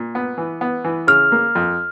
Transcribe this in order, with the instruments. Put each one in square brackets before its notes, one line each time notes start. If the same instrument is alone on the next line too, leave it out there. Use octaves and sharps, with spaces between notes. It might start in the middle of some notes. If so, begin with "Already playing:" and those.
Already playing: [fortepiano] A#2
B3
E3
B3
E3
[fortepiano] C#3 [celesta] F6
[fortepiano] A#3
F2